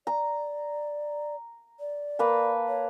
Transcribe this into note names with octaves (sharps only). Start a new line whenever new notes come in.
D5 A#5
D5
A#3 B4 A5
C#5